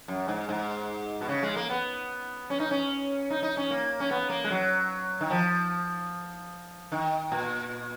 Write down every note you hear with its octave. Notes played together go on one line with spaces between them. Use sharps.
F#2
G#2
G#2
B2
C#3
G#3
A#3
B3
C#4
D#4
C#4
D#4
D#4
C#4
A#3
C#4
B3
A#3
G#3
F#3
D#3
F3
D#3
A#2